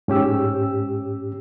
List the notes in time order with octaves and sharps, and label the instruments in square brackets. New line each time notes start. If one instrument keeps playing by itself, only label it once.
[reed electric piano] G#2 C#4 G4 E6